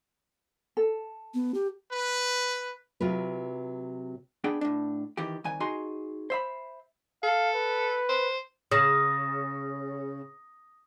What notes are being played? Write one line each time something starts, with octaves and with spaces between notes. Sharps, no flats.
A4
B3
G4
B4
C3 F#3 F4 B4
B3 D4 G#4 G5
A2 D4
D#3 E3 G4
C2 D#3 G#5
D#4 F#4 G#4 G#5 A#5 C6
C5 E5 B5
A4 F5
B4
C5
C#3 D#6 A#6